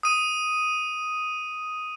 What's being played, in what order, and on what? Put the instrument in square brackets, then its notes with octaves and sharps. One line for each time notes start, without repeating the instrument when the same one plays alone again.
[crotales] D#6 D#7